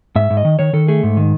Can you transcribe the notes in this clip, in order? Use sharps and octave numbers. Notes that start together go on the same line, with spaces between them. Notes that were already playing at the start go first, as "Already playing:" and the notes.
G#2 E5
G#2
D#5
D#3
D#3 C#5
D#3 A4
A3 G#4
G#2
D#3